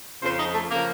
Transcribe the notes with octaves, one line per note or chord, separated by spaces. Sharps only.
F2 C#3 F3 C5
D#4
A3
C#3 F3 A#3